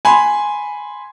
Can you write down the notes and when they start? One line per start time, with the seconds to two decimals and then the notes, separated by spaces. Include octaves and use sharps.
0.05 G#5 B5 C6